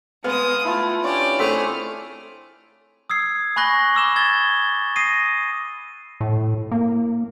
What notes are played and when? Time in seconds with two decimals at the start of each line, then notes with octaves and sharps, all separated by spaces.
0.24 G#3 B3 F5 G#5 D#6
0.65 A3 E4 F4
1.04 C#4 D4 G4 C#5 D5
1.39 A3 C4 G#4 F6
3.10 D#6 E6 G#6 C7
3.56 G#5 B5 C#6 F#6 A#6 G7
3.95 D6 E6 E7 G7
4.16 D#6 G#6 A6 G7
4.96 D#6 A#6 C7 D#7
6.21 A2
6.71 A#3